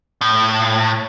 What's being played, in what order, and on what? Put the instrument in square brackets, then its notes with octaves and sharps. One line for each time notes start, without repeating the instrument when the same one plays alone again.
[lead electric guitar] A2